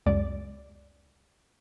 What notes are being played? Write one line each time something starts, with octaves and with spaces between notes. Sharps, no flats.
C#2 F#2 G#3 D5